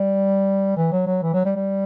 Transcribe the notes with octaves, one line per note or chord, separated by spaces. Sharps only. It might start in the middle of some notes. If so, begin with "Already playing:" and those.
Already playing: G3
E3
F#3
F#3
E3
F#3
G3
G3